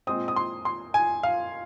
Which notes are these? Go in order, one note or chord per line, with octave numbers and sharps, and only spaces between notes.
A#2 G#3 C4 D#6
D#6
C6
C6
G#5
F5